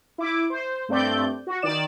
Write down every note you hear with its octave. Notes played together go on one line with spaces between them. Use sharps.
E4 D6
C5
G2 A3 C4 D5 G6
F#4
D#3 D5 E7